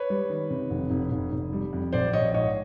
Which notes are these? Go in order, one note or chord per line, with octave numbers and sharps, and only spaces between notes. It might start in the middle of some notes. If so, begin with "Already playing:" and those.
Already playing: B4 C#5
G3
D#3
C3
F1
F1
F1
F1
G3
F2
A#1 C5 D5
A#1 C#5 D#5
G#2 C#5 D#5